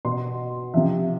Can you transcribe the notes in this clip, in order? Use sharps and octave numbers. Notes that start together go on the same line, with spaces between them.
B2 C6
C3 F3 E5